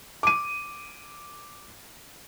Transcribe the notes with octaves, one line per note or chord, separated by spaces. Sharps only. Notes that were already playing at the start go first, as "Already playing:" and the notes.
D6 D#7